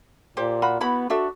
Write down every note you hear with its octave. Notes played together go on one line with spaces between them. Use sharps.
A#2 G4 C5
F4 F#4 B5
B3 E4 F#4 B5
D4 F#4 A4 E5